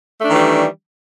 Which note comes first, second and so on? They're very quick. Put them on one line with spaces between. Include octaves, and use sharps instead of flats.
A3 D4 D#3 E3 G3